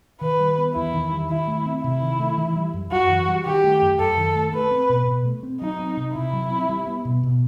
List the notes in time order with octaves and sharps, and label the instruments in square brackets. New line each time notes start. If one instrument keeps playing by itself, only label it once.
[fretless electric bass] D#3 [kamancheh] B4
[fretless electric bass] G3
B3
[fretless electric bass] E2 [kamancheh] E4
[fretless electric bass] D#3
G3
[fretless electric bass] D#3 [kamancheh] E4
[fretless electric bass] A3
C4
[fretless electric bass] C3 [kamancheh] E4
[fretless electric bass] D#3
A3
E3
G3
F#2
[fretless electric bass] F#2 [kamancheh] F#4
[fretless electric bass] E3
G3
[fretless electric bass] D#3 [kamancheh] G4
[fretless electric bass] A3
F#2
[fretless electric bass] F#2 [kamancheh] A4
[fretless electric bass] D#3
A3
[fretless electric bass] A3 [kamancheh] B4
[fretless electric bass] C4
B2
B2
A3
C4
[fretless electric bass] F#3 [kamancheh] D#4
[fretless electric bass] C4
C3
[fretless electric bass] C3 [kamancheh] E4
[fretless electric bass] F#3
C4
G3
B3
B2
B2